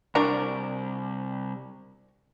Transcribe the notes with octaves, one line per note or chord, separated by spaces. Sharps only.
C2 D4 F#4 A#4